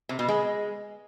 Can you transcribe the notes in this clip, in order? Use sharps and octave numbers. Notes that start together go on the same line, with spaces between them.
C3
B2
G#3